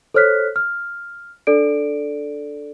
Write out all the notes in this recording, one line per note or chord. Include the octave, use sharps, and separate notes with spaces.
A4 C5 C#5 F6 F#6 B6
F6
D4 A4 D5 D7